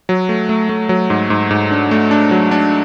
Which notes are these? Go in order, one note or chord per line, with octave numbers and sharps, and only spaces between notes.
F#3
A3
A3
A3
F#3
G#2
G#2
G#2
D4
A3
D4
F#3
D4